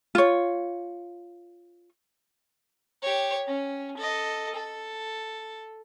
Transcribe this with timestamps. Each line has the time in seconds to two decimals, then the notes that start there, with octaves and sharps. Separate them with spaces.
0.15 F4 C#5
3.03 G4 C#5
3.48 C#4
3.97 A4 D#5
4.55 A4